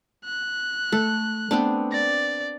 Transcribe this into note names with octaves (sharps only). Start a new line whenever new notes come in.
F#6
A3 A4
A3 B3 C4 D4
D5 A#6